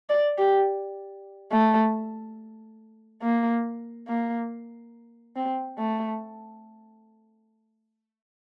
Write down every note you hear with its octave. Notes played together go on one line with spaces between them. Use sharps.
D5
G4
A3
A#3
A#3
C4
A3